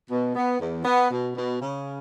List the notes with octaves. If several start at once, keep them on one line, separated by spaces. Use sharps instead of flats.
B2
B3
E2
B3
B2
B2
C#3